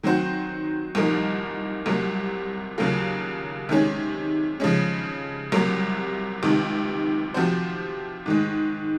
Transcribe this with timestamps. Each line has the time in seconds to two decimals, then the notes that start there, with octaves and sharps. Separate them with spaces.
0.03 D#3 F#3 C4 F#4 C5
0.95 C2 A#2 F3 A#3 D#4
1.86 C2 C3 F#3 A#3
2.78 D#2 C#3 F#3 A#3 F4
3.69 C3 D#3 G#3 C#4
4.60 C#3 F3 G#3 C#4
5.52 C2 C3 F#3 A#3
6.43 C#2 C3 D#3
7.34 C3 F3 C4 F#4 C5
8.26 G#2 D#3 G#3